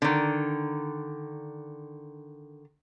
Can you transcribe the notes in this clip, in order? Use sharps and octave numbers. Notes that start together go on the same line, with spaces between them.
D3 D#3